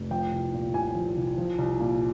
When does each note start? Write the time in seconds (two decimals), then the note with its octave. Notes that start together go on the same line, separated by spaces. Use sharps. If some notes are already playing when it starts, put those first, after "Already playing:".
Already playing: F1
0.10 F3 G5
0.32 C2
0.54 A#2
0.74 C2 G#5
0.95 F3
1.16 C2
1.38 F3
1.58 C2
1.80 A#2